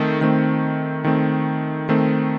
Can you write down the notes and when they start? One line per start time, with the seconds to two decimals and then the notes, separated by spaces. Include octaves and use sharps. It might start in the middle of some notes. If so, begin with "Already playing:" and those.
Already playing: D#3 A3 C4
0.21 D#3 A3 C4
1.04 D#3 A3 C4
1.89 D#3 A3 C4